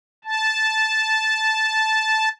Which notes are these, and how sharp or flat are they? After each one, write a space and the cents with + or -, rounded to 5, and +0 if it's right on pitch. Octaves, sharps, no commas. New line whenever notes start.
A5 -10